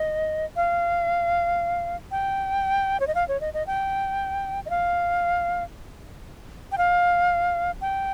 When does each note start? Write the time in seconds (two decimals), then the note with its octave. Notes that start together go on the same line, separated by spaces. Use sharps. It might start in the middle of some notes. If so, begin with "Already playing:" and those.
Already playing: D#5
0.56 F5
2.11 G5
3.00 C#5
3.07 D#5
3.15 F5
3.28 C#5
3.41 D#5
3.54 D#5
3.67 G5
4.66 D#5
4.70 F5
6.72 G5
6.78 F5
7.81 G5